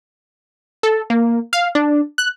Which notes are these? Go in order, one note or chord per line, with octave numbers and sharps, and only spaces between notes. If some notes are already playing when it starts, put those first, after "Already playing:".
A4
A#3
F5
D4
F#6